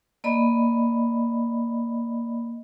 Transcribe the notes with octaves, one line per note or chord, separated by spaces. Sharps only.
A#3 D5 D#5 B5